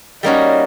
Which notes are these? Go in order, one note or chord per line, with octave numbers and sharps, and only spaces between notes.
G3 A#3 C#4 D#4 F#4